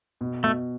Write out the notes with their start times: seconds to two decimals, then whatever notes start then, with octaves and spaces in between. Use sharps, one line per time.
0.21 B2
0.44 B2 A3